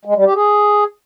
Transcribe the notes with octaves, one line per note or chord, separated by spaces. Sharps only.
G#3
G3
G4
G#4